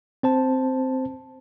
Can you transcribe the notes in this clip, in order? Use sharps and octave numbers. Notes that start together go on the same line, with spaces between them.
C4 C5 A5